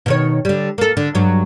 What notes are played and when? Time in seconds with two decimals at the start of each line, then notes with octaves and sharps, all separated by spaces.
0.06 B2 D#3 C#5
0.45 D3 G3
0.78 A#3 A4
0.97 D3
1.15 G2 F#3